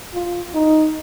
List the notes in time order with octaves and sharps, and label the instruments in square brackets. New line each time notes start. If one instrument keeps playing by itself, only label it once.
[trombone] F4
D#4